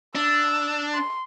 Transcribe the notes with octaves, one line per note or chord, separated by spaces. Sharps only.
D4 E6
C6